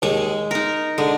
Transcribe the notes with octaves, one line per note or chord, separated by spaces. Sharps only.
D#2 D#3 G#3
D#4 A#4
D3 G#3